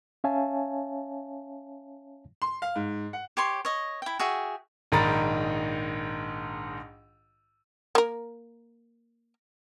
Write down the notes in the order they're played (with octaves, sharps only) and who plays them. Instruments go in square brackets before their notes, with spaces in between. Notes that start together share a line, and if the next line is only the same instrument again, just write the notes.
[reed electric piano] C#4 C#5 E5 F5 G#5 A5
[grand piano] C6
F5
G#2
F#5
[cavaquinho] G4 C#5 C6
C#5 D#5
E4 G5
F#4 G#4 E5 G5
[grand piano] A#1 G#2 D#3 A#5 B5 A6
[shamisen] A#3 A#4